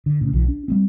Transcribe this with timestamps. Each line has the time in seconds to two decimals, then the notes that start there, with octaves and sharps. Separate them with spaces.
0.06 D3
0.21 A2 C#3
0.33 B1 B2 E3
0.48 D4
0.68 G3 B3 C4